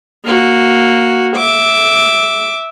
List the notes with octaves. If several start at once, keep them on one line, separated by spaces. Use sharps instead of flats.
A#3 F#4
E5 D6